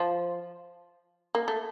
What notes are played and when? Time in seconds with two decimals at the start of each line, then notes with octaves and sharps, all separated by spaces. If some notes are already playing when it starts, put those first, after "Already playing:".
Already playing: F3
1.35 A#3
1.48 A3